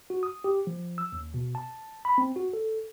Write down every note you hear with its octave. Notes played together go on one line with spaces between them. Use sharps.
F#4
D#6
G4
F3
E6
D#2
B2
A5
B5
C4
F#4
A4